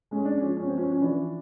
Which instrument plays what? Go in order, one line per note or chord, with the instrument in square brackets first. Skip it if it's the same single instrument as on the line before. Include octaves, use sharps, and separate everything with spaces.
[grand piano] G#3 [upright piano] C#4
[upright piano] D4
C#4
[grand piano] F3
[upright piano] C#4
[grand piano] F3 [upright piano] C4
[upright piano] C#4
C#4
[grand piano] E3 [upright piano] D4